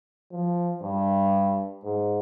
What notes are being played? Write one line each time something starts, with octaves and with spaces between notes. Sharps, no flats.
F3
G2
G#2